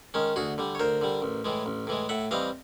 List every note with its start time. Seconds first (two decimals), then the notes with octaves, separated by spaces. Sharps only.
0.14 D#3 G#3 C#4
0.36 D2 F#4 G#4
0.58 D3 G3
0.75 C#5
0.79 D2 A#4 C5
1.01 D3 G3
1.22 A1
1.45 A2 E3 G#3
1.66 A1
1.87 A2 E3 G#3
2.09 A2 E5 F#5
2.31 E3 G3 C4 D#5 F5